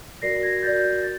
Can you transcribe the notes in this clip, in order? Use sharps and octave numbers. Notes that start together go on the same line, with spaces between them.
F#4 A#4 D5 A#6 C7
G#6 A#6
F#4 A#4 D5 G6 A6
A6